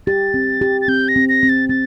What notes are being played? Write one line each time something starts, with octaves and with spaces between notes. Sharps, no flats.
G4 A6
C4
G4
A6
C4 G6
A#6
C4
A#6
C4
A6
C4 A6